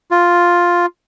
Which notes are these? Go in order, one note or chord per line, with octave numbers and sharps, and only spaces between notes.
F4